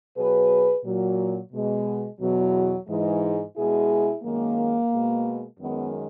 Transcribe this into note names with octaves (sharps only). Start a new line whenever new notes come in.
B2 F#3 G#4 B4
A#2 F#3
B2 G#3
E2 B2 F#3
G#2 E3 G#3
B2 G#3 E4 G#4
F#2 D#3 G#3 A#3
B2 G#3
F#2 D#3 G#3 B3